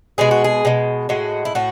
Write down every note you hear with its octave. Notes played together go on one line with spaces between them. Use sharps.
B2 G#3 G#4
F#4
G#4
B2 G#3
A2 G#3 F#4
E4
A2 F#4